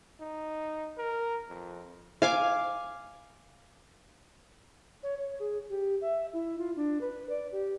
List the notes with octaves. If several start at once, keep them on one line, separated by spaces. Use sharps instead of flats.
D#4
A#4
F2
F5 G#5 D6
C#5
C#5
G#4
G4
E5
E4
F4
D4
B4
D5
G4